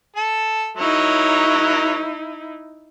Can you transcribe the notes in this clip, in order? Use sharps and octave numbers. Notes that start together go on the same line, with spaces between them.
A4 A5
F#3 D#4 E4 A#4 C#5